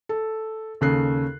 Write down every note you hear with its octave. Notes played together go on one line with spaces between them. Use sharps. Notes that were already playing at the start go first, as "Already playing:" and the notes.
A4
D#2 C#3 A4 F#6 C7